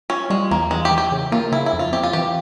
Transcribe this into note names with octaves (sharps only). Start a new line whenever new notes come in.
C#4 F4
G3 G#3
E2 A#3
E3 G#3
G4
E3
G4
C#3
A#3 F4
C#3 E4
E4
F2
F4
C4 G4
F4
E3 G4